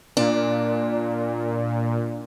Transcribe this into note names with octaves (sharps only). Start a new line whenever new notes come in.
A#2 D4